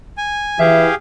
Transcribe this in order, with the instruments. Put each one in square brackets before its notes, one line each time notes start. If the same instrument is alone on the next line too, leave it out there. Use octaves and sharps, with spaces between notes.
[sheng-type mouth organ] G#5
[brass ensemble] E3 [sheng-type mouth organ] G4 G#4 F5 [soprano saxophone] E5